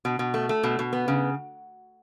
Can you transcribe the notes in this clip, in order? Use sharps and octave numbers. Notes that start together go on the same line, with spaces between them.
B2
B2
A3
A3
B2
B2
B3
C#3